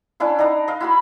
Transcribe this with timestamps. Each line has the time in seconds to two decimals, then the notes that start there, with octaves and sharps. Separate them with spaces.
0.20 C#4 D4 E4 F5
0.39 D4 D#4 F#5 A#5
0.68 D#5 F5
0.80 E4 F#4 B5